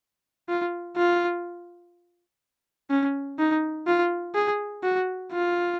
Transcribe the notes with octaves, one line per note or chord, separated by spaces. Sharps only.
F4
F4
C#4
D#4
F4
G#4
F#4
F4